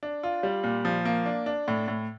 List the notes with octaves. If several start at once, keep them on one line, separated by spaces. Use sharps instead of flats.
D4
F4
G3
A#2
F3
A#3
D4
D4
A2
A2